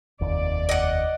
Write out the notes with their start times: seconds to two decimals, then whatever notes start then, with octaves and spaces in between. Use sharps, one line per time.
0.20 F1 D#2 D5
0.69 D#5 F#5